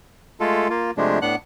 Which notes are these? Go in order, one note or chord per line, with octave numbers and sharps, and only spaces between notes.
G#3 A3 F4 A4
A#3 F4
C3 F3 G#3 A3 D4
A2 B3 D4 F#5 F#6